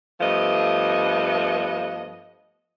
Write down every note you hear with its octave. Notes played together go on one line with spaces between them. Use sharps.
G2 F3 A3 B3 D#5